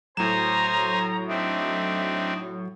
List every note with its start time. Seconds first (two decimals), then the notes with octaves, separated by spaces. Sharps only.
0.17 A2 F#3 C5 G#5 A#5 E7
1.28 C4 D4 D#4 E5